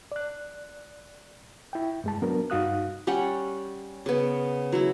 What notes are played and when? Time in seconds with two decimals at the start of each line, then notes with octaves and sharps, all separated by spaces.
0.12 D5 F#6
1.73 E4 G5
2.04 G2 G#3 A5
2.22 F#3 B3 D4 A#4
2.50 G2 D#4 F#4 F5 D#6 F#6
3.07 G3 C#4 F#5 G5
4.06 C#3 B3
4.72 F#3 E4